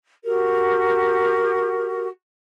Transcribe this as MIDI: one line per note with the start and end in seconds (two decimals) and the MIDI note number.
0.24 2.08 66
0.24 2.08 67
0.24 2.08 70